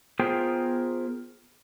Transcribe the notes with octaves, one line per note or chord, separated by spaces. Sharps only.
B3 F4 G#4 A#4 C5 G5